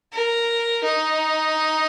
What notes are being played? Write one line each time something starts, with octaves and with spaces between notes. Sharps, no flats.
A#4
D#4